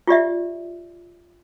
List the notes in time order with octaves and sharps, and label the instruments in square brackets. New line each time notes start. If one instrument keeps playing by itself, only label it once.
[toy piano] F4 G4 D5 E5